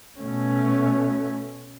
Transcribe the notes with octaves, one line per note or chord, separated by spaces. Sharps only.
B2 A3 C#4